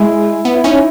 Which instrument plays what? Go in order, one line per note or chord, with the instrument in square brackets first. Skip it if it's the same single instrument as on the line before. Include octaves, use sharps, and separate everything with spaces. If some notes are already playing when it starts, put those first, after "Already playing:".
Already playing: [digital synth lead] G#3 [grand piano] E4
[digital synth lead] B3
[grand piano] E4
[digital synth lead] C#4 [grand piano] D#4